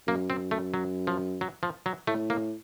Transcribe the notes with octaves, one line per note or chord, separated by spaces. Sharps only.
F#2 A#3
C4
A3
F#3
F3
F#3
F3
F#3
A2 A3
A#3